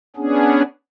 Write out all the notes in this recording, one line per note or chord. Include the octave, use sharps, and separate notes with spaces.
B3 C#4 D4 G#4